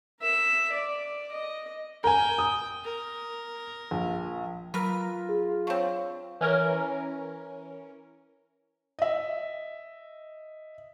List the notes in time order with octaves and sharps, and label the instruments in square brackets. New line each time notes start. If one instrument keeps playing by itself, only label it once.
[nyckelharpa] A#4 E5
D5
D#5
[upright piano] A#4 G#5 [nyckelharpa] G5
[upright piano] D#6
[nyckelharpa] A#4
[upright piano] A#1
[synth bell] F#3 F6 A#6 [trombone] F4 [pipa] A#4 B4
[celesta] G#4
[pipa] D3 C4 [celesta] C#5 F5 C#6
[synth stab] E3 C#4 A#4
[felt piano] D#5 E5